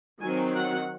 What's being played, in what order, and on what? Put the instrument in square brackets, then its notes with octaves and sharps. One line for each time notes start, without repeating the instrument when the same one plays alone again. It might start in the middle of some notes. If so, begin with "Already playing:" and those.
[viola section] D#3 F#3 C4 G#5
F#5